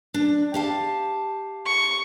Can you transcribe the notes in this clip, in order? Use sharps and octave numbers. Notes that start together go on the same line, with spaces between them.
D4
G4 F5 A5
C#6